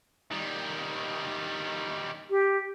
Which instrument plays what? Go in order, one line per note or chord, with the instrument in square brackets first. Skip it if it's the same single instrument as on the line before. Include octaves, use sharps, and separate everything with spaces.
[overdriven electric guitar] D#3 G3
[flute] G4